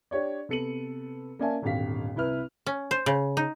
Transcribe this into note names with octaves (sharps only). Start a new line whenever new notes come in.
D4 G4 C#5 D5
C3 B3 A4 C#7 D#7 F#7
A#3 C#4 D5 E5 G#5 A5
D#1 G#1 D3 G4 F5 B6
C2 E4 B4 F6
C#4
C5
C#3
D#4